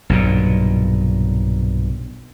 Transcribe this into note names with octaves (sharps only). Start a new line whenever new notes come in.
B1 G2 A#2